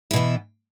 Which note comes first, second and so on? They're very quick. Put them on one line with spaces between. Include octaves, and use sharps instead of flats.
E4 B2 E3